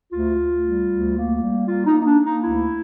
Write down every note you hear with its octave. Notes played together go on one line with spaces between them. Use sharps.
D2 F4
D2
G3
D2
A#3
G3
A#3 F4
D#4
A#3
D#4
D4
A#3
D#4
D2 E4